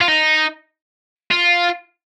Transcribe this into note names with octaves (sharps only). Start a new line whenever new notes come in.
F4
D#4
F4